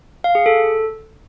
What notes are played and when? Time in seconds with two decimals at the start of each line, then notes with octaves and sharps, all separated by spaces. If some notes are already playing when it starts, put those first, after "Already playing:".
0.24 F5
0.35 G#4
0.46 A4